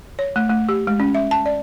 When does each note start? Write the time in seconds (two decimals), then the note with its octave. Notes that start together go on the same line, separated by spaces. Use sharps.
0.19 C#5
0.36 A3
0.50 A3
0.69 G4
0.87 G#3
1.00 C#4
1.15 E5
1.31 A5
1.46 D5